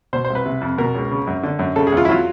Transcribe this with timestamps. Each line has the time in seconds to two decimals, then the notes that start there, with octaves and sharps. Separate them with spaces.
0.13 B2 C5
0.25 C5
0.30 C2
0.35 B4
0.46 C3
0.61 F2
0.78 B2 A#4
0.95 C#2
1.11 C#3
1.27 F#2
1.43 D3
1.59 F#2
1.76 C#3 A4
1.87 G#4
1.92 E2 F4
2.05 E4
2.09 F#3 F4